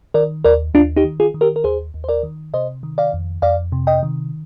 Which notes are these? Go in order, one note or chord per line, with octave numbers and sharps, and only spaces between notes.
D#3 A#4 D5
D#2 A#4 D5
D#2 D4 F4
D#4 G4
D#3
F4 G#4
D#3
G4 A#4
A#4
D#2 G#4 C5
D#2
C5
A#4 D5
D#3
C3 C5 D#5
D#3
D5 F5
F2
F2 D5 F5
C3
D#5 G5
D#3